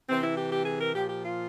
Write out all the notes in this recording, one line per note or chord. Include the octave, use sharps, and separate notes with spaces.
C3 E3 C4
E4
G4
G4
G#4
A#4
A#2 F3 G4
G4
F4